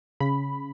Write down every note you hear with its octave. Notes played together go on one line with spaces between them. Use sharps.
C#3 B5